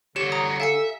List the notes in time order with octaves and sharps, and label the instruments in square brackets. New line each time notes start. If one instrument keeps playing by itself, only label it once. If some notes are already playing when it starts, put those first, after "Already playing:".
[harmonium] D3 [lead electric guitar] G3 C#5 [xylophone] G4 E7
[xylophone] A#5 D#6
[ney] A4 [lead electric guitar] E5 [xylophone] F5 G#5 C#7